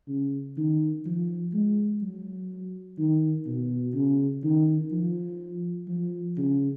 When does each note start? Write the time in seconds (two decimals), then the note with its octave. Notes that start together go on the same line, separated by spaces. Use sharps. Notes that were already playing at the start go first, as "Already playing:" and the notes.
0.08 C#3
0.57 D#3
1.06 F3
1.53 G#3
2.02 F#3
2.98 D#3
3.47 B2
3.95 C#3
4.44 D#3
4.92 F3
5.88 F3
6.37 C#3